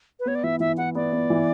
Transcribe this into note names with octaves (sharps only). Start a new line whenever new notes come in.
B4
B3 C#5
D5
E3 E5
E3 E5
E4 F#5
B3 D5
B3
E3